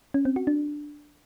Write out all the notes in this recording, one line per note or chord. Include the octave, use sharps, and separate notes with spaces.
C#4
C4
F#4
D4